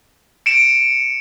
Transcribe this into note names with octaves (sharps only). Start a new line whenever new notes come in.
C#7 D7 E7